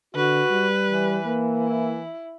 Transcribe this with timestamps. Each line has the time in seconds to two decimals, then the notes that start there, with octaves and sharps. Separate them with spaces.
0.15 D3 F#4 B4
0.51 G3
0.86 E3
1.26 A#3
1.59 E4